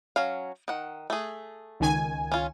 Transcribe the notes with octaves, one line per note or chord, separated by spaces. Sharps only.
F#3 C#4 F5
D#3 F#5
A3 G#4
C#2 D#3 G#5
C#4 F4